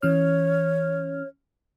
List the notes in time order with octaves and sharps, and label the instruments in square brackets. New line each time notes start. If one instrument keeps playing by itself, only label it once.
[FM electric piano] E3 C#4 F6 [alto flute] C#5